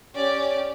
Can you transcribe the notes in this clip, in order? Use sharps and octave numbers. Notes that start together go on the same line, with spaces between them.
C#4 G4 D5